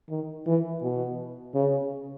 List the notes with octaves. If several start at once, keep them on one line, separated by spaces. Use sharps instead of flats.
D#3
E3
B2
C#3